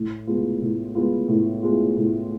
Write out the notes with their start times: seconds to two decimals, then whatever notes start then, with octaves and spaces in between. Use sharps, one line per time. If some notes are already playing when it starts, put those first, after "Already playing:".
Already playing: A2
0.27 G#3 B3 F4
0.61 A2
0.95 G#3 B3 F4
1.28 A2
1.63 G#3 B3 F4
1.97 A2